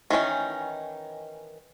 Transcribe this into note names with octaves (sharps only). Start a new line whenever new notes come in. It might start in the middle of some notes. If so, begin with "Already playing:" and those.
D#3 E3 C#4 D#4